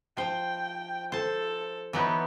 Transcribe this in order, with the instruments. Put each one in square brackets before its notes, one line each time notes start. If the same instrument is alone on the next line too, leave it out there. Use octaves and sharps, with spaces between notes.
[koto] F3 C5 [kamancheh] G5
[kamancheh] A4 [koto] C5 A5
[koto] E3 F#3 D#4 [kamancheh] B3